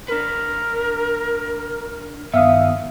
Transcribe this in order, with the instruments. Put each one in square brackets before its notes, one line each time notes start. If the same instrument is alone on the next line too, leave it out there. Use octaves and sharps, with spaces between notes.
[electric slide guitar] D4 B4 [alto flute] A#4
[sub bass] G2 [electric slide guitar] D#3 B3 [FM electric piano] E5 F5 D#6